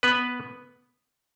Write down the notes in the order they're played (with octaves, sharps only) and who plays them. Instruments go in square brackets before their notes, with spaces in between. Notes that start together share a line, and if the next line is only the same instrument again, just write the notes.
[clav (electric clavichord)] B3 B4